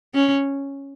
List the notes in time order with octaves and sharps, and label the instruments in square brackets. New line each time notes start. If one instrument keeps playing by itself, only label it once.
[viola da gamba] C#4